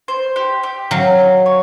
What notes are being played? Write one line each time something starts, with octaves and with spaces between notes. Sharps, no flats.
C5
G4
G4
F#3 F5
D#4
C#5